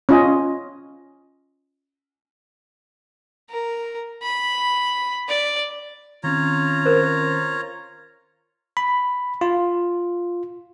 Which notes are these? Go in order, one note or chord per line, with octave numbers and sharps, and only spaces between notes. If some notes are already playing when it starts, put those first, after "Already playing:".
C#4 F4 D#5
A#4
B5
D5
D#3 C4 C#4 F4 C#5 A#5
A#4 C5
B5
F4